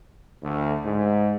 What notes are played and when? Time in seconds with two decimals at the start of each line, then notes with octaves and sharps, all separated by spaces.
0.43 D2
0.85 G#2